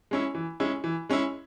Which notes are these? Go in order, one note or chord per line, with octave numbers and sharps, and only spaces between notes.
G#3 C#4 E4
E3
G#3 C#4 E4
E3
G#3 C#4 E4